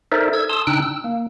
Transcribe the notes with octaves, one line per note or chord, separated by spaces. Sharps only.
D#4 A4 A#4 C5 D5 E5
A4 E6 G#6
A5 C6 D#6 E6
C#3 D4 D#4 G5 E6 F#6
E6
A#3